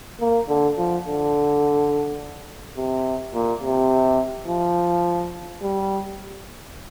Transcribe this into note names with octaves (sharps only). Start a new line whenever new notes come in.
A#3
D3
F3
D3
C3
A#2
C3
F3
G3